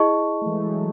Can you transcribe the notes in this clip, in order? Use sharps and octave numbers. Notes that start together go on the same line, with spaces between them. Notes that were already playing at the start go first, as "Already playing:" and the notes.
Already playing: E4 G#4 D#5 A5 C#6
A3
E3 G#3
F#3 A3